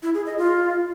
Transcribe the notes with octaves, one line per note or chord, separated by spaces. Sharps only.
E4
G#4
D#5
F4